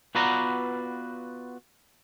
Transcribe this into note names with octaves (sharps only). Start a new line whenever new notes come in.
B3 F4 F#4 B4 D5 A#5